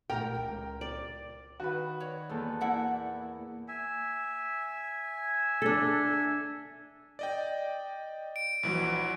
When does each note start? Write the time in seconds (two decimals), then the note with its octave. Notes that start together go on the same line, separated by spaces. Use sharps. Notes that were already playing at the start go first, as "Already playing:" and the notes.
0.10 A#2 A3 A#4 G5 A#5
0.34 C#2
0.81 D5
1.60 D#3 F#4 B4
2.00 C#5 D5
2.29 E2 A#2 A4
2.61 A#3 E4 D5 E5 F#5
3.68 E5 G#5
5.62 D4 A4
7.19 D5 D#5 G5
8.36 D7
8.63 A#1 E3 F#3